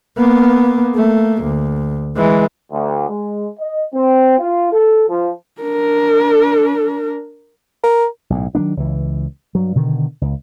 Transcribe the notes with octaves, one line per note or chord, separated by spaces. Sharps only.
A#3 B3
A3 A#3
D2
E3 G#3
D2
G#3
D#5
C4
F4
A4
F3
D4 A#4
A#4
B1 A2
D#3 F#3 A#3 D4
C#2 E3
G2 F#3
B2 D3 D#3
C#2